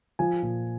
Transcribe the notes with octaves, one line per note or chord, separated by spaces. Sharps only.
F3 G#5
A#2